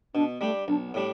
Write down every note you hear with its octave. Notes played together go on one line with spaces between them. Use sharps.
B2 D4
G3 A3 D4 G4
B1 D4
B3
A2 G3 D4